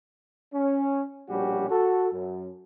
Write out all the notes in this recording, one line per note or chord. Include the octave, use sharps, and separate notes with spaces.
C#4
A#1 B2 G3 C#4 F#4 G4
F#4 A4
F#2